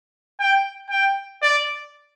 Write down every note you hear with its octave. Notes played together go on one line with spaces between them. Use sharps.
G5
G5
D5